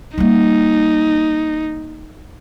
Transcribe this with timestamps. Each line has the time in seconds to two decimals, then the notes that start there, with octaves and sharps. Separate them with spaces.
0.18 G3 A#3 D#4